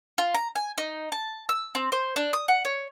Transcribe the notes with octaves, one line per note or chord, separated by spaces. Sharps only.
F4
A#5
G#5
D#4
A5
E6
C4
C5
D4
D#6
F#5
C#5